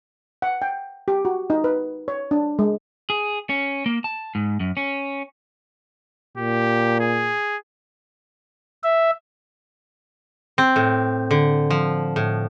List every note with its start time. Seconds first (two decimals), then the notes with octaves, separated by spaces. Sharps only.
0.42 F#5
0.62 G5
1.08 G4
1.25 F#4
1.50 D#4
1.64 B4
2.08 C#5
2.31 D4
2.59 G#3
3.10 G#4
3.49 C#4
3.86 A#3
4.04 A5
4.35 G#2
4.60 F#2
4.77 C#4
6.38 A#2 G4
7.00 G#4
8.83 E5
10.58 C4
10.76 A2
11.31 D3
11.70 F3
12.16 A2